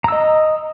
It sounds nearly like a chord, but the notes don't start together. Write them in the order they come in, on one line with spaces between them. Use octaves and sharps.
A#5 E6 D#5